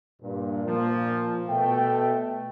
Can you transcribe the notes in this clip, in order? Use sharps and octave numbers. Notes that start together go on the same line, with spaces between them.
G2 A#2
A#2 F3 A#3
B2 A3 G5